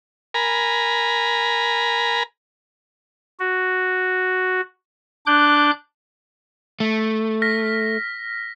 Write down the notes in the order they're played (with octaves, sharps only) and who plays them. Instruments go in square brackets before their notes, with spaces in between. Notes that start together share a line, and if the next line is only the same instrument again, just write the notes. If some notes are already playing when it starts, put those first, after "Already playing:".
[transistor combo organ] A#4 G#5 A#5 B5
[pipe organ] F#4
D4 D6 F#6 G6
[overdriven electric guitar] A3
[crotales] F6 A#6 B6